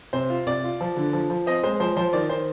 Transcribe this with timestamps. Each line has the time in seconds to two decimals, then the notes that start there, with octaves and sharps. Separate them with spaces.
0.13 C3 C5
0.29 F4
0.47 C3 D5
0.64 F4
0.81 F3
0.97 D3
1.13 F3
1.30 F3
1.46 C4 D#5
1.63 G#3 C5
1.80 F3 C5
1.97 F3 C5
2.13 D#3 D5
2.30 D#3 C5